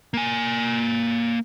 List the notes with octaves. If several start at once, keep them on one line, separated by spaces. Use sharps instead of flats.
A#3 G#5